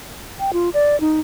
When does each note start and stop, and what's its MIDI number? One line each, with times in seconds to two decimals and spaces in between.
0.40 0.51 79
0.53 0.69 65
0.74 0.99 74
1.01 1.20 63